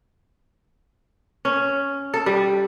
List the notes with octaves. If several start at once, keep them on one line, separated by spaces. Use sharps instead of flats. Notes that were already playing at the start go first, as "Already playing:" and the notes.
C#4
A4
G3